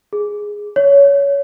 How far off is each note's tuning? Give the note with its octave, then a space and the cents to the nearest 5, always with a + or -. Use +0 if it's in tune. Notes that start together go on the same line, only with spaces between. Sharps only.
G#4 -5
C#5 +20